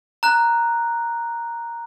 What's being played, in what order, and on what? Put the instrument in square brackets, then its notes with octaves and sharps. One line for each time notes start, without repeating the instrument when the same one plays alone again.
[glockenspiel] A#5 F#6